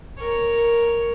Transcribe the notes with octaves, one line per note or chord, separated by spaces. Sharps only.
A#4 C#5